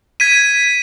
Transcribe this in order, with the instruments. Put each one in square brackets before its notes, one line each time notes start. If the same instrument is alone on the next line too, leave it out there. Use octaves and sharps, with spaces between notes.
[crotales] G#6 B6 D#7